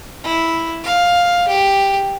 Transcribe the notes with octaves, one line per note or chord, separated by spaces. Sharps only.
E4
F5
G4